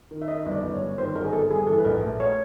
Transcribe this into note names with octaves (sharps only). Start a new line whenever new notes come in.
D#3
E5
D#3 D#5
G1
D5
G1
C#5
G2
D#3 C5
G1 A#4
G#4
G1 A4
G2 G#4
E3 A4
B4
A#1 A#4
A3
C#5